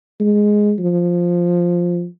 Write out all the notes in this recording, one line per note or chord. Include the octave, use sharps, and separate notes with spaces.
G#3
F3